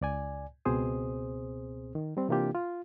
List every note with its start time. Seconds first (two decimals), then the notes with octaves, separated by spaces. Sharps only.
0.01 C#2 D5 G#5
0.65 C#2 B2 C4 G#4 C5 D#6
1.95 D#3
2.17 G3 C4
2.29 C3 E3 A#3 D4 F4 G4
2.55 F4